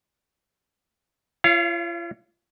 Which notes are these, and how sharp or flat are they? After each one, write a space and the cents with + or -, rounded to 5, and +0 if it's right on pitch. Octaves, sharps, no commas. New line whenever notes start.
F4 -45 C#5 +0 F5 -10